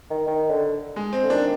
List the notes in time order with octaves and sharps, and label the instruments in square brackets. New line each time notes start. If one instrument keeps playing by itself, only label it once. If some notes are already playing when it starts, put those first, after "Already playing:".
[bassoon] D#3
D#3
D3
[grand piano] G#3
C4
[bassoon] D3
[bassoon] D#3 [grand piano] D4